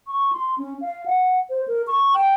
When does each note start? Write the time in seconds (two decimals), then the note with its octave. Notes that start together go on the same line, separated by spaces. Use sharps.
0.07 C#6
0.33 C6
0.58 C#4
0.81 F5
1.06 F#5
1.50 C5
1.68 A#4
1.87 C#6
2.14 G5